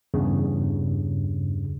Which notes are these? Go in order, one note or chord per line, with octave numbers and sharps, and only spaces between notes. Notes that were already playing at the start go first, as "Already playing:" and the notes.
E2 G2 C#3